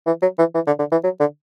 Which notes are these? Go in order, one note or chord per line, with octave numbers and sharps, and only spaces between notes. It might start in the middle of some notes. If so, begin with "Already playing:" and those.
E3
F#3
E3
E3
D3
D3
E3
F#3
D3